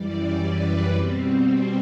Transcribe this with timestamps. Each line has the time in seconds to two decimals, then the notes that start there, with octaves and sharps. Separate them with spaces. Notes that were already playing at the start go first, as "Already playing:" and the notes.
Already playing: F#2 E3 G3 D5
0.41 B4
0.92 B2 G3 C4
1.45 C4